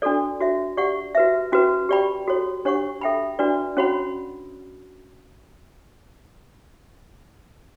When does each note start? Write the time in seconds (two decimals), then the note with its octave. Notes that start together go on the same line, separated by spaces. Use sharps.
0.02 D4 F#4 A4 D5
0.40 F#4 C#5 E5
0.77 G4 D5 F#5 C#6
1.15 F#4 B4 E5
1.52 C#4 F#4 B4
1.89 G4 D5 G5 B5
2.27 F#4 A4 C#5
2.65 D4 G4 C#5 F#5 C#6
3.01 A4 E5 G5 B5
3.39 D4 F#4 B4 D5
3.77 C#4 F#4 C#5 F#5 B5